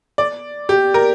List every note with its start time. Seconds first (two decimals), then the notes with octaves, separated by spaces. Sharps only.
0.18 D5
0.69 G4
0.94 A#4